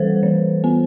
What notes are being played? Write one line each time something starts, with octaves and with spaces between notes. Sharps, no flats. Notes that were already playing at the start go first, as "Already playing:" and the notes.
Already playing: E3 G3 A4 B4 C5
E3
B3